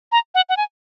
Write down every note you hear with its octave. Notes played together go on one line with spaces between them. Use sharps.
A#5
F#5
F#5
G#5